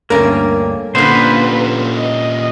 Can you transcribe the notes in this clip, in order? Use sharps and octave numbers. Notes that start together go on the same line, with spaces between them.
D2 G2 D3 A#3 C#4 A#4
A#2 D3 A#3 B3 C#4 B4 C5
D#5